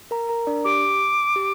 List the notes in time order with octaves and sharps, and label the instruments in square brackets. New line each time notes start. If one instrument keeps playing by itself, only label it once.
[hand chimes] A#4 A#5
A#4 A#5
D4 D5
[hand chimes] G4 [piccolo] D6
[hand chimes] G4